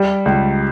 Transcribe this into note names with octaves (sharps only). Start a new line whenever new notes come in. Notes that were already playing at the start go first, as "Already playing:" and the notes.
Already playing: G3
C#2